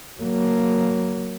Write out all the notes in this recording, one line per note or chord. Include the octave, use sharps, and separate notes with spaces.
F#3 A#3